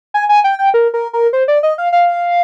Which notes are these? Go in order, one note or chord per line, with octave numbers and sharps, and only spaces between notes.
G#5
G#5
G5
G5
A#4
A#4
A#4
C5
D5
D#5
F5
F5